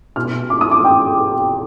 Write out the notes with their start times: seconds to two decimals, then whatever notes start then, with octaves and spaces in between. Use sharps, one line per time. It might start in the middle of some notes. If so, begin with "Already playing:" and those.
0.16 B2 F6
0.50 D6
0.61 D#6
0.71 D6
0.84 G5